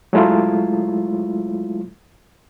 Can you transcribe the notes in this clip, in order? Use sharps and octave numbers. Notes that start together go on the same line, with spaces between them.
F#3 G#3 A3 E4 F4